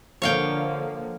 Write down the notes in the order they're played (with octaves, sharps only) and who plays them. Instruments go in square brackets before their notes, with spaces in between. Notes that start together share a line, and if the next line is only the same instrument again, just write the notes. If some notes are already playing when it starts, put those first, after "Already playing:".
[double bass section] D3 F3 A#3 [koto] C#5 F5 G5